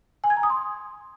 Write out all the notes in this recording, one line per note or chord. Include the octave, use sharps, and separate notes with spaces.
G#5
G#6
A#5
D#6
C6